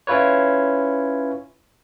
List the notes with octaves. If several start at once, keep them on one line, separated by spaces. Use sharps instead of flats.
C#4 E4 F4 B4 C#5